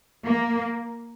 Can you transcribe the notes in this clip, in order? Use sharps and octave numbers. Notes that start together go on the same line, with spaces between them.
A#3